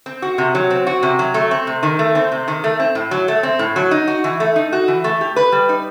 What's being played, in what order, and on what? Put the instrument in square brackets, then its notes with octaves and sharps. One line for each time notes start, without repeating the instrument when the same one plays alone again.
[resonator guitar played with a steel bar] C4
F#4
C3
F#3
C4
F#4
C3
F#3
A3
C4
C3
D#3
A3
C4
C3
D#3
A3
C4
A2
F#3
A3
C4
A2
F#3
D#4
F#4
E3
A3
D#4
F#4
E3
A3
G4
B4
G3
D#4